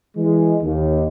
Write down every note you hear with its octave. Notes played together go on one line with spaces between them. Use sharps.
E3 G#3
D#2